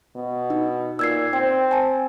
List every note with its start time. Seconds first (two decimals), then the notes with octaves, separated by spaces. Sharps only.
0.16 B2
0.50 D#4
0.99 A#2 E6 G#6 C7
1.33 C4 G5
1.71 G#5 A5